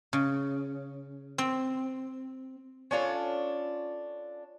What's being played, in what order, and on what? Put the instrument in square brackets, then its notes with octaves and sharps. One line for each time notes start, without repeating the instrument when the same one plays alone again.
[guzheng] C#3
C4
[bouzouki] C#4 D4 F4 A4